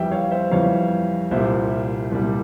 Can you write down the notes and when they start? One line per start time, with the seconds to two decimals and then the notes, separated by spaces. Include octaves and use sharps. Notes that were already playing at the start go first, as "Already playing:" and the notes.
Already playing: F2 E3 G3 E5 G5
0.11 C#5 F5
0.31 C5 E5
0.51 F2 E3 G3 C#5 F5
1.31 C2 A#2 G3 C5 E5
2.12 C2 A#2 G3